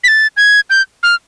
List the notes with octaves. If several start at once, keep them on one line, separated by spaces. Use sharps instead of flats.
B6
A6
G#6
G6
F6